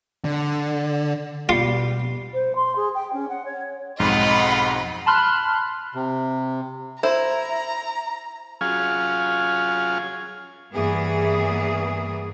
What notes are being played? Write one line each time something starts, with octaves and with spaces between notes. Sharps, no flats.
D3
B2 G3 F4 C7 C#7
C5
C6
G#4
G5
C#4
F#5
C#5
B1 F2 G#2 F4 D#5 F#5 B5
A5 B5 C6 F6 F#6
C3
E4 C5 A#5
F#3 C#4 F4 G#4 F5 G#5
G2 E3 A#3 B3 G#4